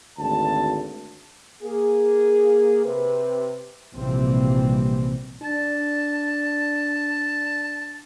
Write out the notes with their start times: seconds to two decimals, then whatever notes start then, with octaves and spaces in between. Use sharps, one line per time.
0.18 G#1 D2 A5
1.63 A#3 G#4
2.84 C3 B4
3.95 A#1 C3 E3 G3 A#3 C4
5.42 D4 A5